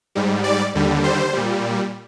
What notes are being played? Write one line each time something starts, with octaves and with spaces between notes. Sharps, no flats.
G#2 G3
D5
D#2 D3 G3
C5
A#2 G3